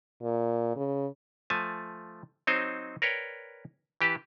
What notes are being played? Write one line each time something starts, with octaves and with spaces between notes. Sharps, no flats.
A#2
C#3
F3 A3 G#5 A5
F#3 C4 D#4 C5 C#5 D#5
A#4 B4 C#5 D5 G5
E3 G4 B4 A5